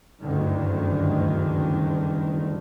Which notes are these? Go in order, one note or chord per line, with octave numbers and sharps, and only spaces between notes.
F#1 D2 G2 D3 D#3